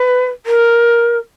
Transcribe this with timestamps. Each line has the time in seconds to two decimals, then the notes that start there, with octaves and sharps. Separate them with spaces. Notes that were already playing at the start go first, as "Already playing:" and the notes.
Already playing: B4
0.46 A#4